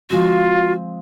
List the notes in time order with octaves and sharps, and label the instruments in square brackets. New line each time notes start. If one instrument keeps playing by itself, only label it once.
[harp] F3 G#3 C4 [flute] F4 [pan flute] F#4